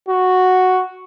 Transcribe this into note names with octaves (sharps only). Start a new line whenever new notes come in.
F#4